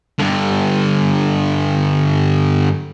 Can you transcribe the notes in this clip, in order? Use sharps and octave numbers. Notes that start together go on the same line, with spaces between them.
G2 D3